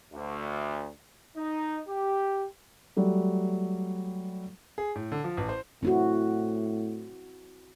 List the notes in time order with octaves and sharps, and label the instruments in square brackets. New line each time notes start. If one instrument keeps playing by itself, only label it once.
[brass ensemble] D2
D#4
G4
[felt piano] F#3 G3 A3
[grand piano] G#4
A2
D3
F3
A1
C5
[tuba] A2 [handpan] C4 E4 F#4